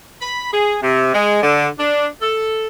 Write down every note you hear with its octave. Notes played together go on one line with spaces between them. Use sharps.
B5
G#4
C3
G#3
D3
D4
A4